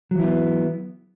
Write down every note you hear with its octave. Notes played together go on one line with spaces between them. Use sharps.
E3 F#3 B3 E4